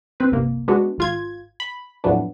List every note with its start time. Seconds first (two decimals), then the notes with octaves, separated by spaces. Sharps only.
0.20 C4 B4
0.32 G1 C2 A#3
0.68 G#3 B3 D4 F#4
0.98 G#1 F4 G#6
1.60 B5
2.04 F2 A2 E3 F#3 B3 D4